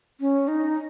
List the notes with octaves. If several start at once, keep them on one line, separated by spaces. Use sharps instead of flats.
C#4
D#4